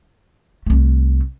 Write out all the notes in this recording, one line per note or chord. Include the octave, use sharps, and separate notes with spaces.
C2 A3